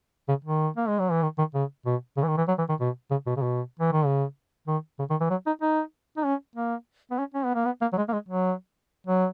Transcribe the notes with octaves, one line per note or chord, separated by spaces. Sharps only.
C#3
D#3
A#3
G#3
F#3
E3
D#3
D#3
C#3
B2
C#3
E3
D#3
E3
F#3
E3
D#3
B2
C#3
B2
C#3
B2
E3
D#3
C#3
D#3
C#3
D#3
E3
F#3
D#4
D#4
D#4
C#4
A#3
B3
C#4
C#4
B3
A#3
B3
A#3
F#3
G#3
A#3
G#3
F#3
F#3